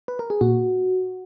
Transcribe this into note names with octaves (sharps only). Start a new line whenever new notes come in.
B4
A#4
G#4
A#2 F#4